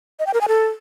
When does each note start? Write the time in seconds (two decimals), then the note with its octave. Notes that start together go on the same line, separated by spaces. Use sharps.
0.19 D#5
0.27 G5
0.34 A#4
0.41 G#5
0.48 A4